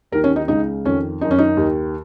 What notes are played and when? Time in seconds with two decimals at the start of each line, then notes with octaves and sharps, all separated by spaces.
0.12 D#2 D#3 A#4
0.24 C#4
0.36 D#4
0.48 C#2 C#3 D#4
0.85 F2 D#3 C#4
1.21 F#2 D#3 D#4
1.31 C#4
1.39 D#4
1.57 D#2 D#3